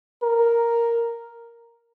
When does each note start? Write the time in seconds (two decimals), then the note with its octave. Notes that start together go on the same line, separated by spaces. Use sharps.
0.23 A#4